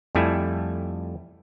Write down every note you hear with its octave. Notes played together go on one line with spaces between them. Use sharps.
F2 G3 A3 E4 G#5